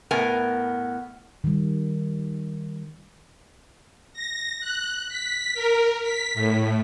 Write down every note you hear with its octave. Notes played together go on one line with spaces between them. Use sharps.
A2 B3 A#4 G#5
D#3 G3
A#6
F#6
B6
A#4
B6
A2